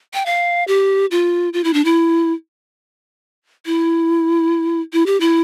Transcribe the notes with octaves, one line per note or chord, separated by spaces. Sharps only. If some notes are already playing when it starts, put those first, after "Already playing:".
G5
F5
G4
F4
F4
E4
D4
E4
E4
E4
G4
E4